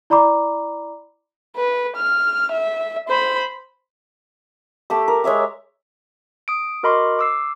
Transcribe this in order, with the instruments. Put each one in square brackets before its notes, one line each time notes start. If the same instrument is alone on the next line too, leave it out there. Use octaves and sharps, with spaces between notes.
[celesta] E4 D5 A#5 B5 D6
[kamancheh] B4
F6
E5
C5 B5
[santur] A3 G4 E6
A#4
G#3 C#5 E5 D6
[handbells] D#6 D7
F#4 A#4 D#5 B5 C6 D6
D6 E6 C7